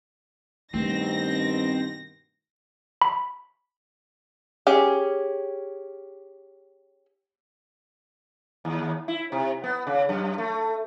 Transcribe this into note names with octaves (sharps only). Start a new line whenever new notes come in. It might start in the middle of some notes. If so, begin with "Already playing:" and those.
G2 B2 D#3 A3 C4 A#6
B5
C#4 G4 G#4
D#2
E4
C3
B3
C#3
F#2
A3